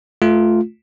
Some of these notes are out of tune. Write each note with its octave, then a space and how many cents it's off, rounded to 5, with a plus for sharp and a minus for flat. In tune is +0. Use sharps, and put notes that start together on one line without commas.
A3 -15 F4 +0